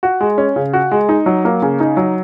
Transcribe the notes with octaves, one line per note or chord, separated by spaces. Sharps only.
F#4
G#3
C#4
C#3
F#4
G#3
D#4
F#3
A#3
C#3
D#4
F#3